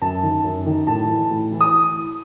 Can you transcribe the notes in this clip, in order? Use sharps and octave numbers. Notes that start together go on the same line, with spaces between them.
F#2 A5
D#3
F#2
D#3
A2 A5
E3
A2
E3
D#6